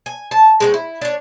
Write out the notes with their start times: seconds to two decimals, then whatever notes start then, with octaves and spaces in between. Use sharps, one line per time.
0.06 G#5
0.31 A5
0.60 G#3 C4 F#4
0.74 E4
1.01 D4 C#5